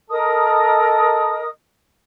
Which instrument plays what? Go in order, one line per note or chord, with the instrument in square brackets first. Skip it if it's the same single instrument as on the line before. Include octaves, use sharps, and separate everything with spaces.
[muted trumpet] A4 [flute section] A#4 D#5 D#6